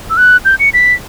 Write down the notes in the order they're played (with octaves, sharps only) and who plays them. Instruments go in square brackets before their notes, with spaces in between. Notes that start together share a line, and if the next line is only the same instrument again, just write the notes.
[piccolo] E6
F#6
G6
C#7
B6